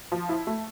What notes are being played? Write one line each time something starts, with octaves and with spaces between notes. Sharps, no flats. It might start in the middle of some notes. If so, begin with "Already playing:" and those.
F3
E4
A3